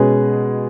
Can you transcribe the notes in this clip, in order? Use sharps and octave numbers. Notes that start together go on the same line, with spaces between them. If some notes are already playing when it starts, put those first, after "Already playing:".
Already playing: B2 G#3 C#4 G#4 B4